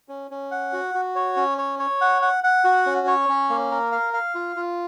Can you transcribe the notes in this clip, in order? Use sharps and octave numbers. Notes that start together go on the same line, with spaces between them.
C#4
C#4
F#5
F#4
F#4
C#5
C#4
C#5
C#5
F#5
F#5
F#5
F#4
C#4
C#5
C#4
A#3
A#4
F5
F5
F4
F4